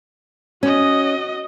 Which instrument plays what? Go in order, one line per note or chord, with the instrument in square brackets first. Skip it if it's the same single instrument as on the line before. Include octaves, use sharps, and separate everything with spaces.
[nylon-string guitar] C#4 [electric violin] F#4 D#5